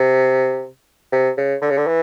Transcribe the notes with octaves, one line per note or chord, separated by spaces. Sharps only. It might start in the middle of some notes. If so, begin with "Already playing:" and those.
Already playing: C3
C3
C#3
D3
C#3
D3
E3